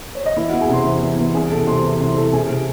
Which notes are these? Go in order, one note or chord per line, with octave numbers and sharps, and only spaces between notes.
C#5
D#5
E3 E4 E5
E2 F#4 F#5
G#4 G#5
C3 C5 C6
E2
E2
E2
C2 G#4 G#5
C3 A4 A5
C3 C5 C6
E3
C2 C5 C6
E3 A4 A5
C3 G#4 G#5
C3